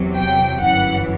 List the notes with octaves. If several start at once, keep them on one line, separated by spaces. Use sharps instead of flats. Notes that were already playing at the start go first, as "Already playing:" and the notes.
Already playing: E2 C3 F#3
G5
G1 F#2 E3 F#5